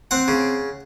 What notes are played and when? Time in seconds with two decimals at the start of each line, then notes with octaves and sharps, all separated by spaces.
0.11 C4 F#5
0.28 C#3